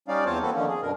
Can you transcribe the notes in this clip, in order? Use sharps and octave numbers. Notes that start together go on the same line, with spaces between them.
G3 C#4 D#4 D5 F5
E2 C4 F4 C5 C#5 A5
A#3 C4 F#4 A4 B4
D3 D#3 F3 A#3 C#4
G#4
F#2 B2 D3 A#4